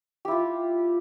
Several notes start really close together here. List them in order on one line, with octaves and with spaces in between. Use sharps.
G4 E4 F4